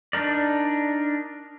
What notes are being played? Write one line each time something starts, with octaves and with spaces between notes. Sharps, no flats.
D4 D#4 A#4 D5